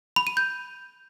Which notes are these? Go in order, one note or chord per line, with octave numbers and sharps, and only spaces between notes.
B5
D#7
G6